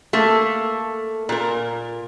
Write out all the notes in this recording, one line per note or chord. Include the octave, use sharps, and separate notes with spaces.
A3 A#3 A4
A#2 A#4